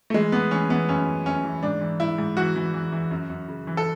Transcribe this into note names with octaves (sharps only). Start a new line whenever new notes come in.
A3
E3 G#3
E3 B3
E3 C#4
E3 B3
F#2 C#4
F#2
F#2 C#4
E3
G#2 D4
E3
G#2 E4
G#2
E3 F#4
E3
E3
E3
F#2
F#2
C#3
E3
A4